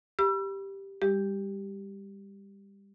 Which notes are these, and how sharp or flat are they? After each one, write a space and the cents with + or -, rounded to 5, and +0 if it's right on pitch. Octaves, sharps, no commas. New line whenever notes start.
G4 +0 B5 -30 E6 +35
G3 +25 G4 -5